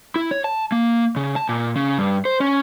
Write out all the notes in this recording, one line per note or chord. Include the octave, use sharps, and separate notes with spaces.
E4
C#5
A5
A#3
C#3
A5
A#2
C#3
G2
C5
C#4